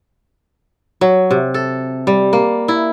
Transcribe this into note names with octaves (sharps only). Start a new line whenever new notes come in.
F#3
C3
A4
G3
A#3
E4